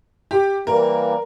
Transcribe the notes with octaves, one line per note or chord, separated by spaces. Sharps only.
G4
E3 G3 A#3 A#4